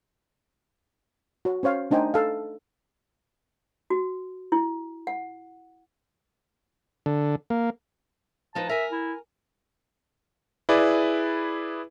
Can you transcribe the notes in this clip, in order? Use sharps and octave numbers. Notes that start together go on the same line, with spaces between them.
F#4 C#5
C#4 C5 C#5 F5
A3 D4 D#4 C5 G5 G#5
A4 F5
F#4
E4
F#5
D3
A#3
F3 D#4 B4 A5
A#4 E5 G#5
E4
E4 G#4 B4 D5